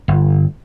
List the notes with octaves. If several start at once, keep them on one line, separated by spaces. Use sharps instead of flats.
G1